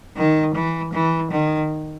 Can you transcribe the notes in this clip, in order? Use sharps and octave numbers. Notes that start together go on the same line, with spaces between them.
D#3
E3
E3
D#3